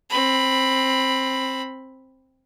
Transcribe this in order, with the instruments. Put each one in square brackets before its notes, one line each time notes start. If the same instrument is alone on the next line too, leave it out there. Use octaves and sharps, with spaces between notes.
[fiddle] C4 B5